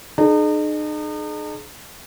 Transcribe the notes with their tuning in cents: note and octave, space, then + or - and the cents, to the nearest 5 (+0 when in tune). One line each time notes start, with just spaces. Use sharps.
D#4 -40 G#4 +35